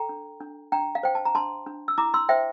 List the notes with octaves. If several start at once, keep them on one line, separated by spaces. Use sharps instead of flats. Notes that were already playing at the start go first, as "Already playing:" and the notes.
Already playing: A4 G5 A#5
D4
D4
D4 G5 A#5
F5
C5 G5
A5
A#5
D4 A5 C6
D4
E6
E4 A#5 D6
C6 E6
C5 E5 G5